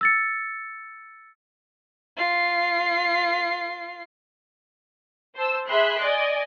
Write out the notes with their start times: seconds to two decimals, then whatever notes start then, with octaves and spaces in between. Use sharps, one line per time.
0.01 E6 A6 C#7
2.17 F4 C7
5.35 C5 A5 E6
5.66 G#4 E5 B5 C6 F#6
6.01 D5 D#5 G#5